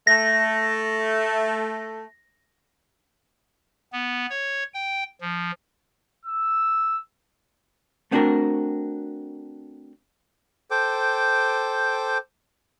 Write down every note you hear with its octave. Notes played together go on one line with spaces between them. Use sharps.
A3 A#6
B3
C#5
G5
F3
E6
A3 B3 C4 D4 F#4 A#4
A4 C5 G5 D6